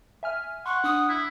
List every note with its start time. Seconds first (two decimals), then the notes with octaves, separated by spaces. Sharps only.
0.23 E5 G#5 F6
0.66 F#5 C6 C#6
0.84 D4 D#6
1.09 E4